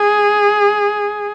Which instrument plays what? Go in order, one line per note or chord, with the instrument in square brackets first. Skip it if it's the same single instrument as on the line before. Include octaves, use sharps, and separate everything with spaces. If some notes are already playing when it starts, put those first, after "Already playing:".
Already playing: [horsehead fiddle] G#4